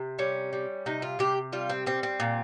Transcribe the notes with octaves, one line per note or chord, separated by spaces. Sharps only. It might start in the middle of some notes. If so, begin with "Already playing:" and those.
Already playing: C3
G3 C#4
G3
C3 D#4
F4
C3 G4
G3 F4
C4
G3 C4
C4
A#2